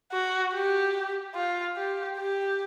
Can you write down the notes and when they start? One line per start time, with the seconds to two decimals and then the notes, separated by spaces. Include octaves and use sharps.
0.12 F#4
0.54 G4
1.35 F4
1.76 G4
2.18 G4